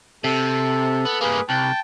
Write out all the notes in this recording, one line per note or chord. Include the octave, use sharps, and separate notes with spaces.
C3 A4
B3
G2 A#3 G#4 B4
C2 G5 A5